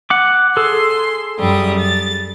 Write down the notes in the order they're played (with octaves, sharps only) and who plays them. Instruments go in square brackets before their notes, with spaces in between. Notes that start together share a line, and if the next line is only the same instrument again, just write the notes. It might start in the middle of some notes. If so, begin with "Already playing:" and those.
[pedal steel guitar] F#5 D6
[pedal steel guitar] G#4 A4 [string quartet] C6
[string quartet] F#2 G3 D#6
A6